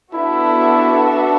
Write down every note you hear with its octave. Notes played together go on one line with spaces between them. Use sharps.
B3 D4 E4 F#4 A4 E5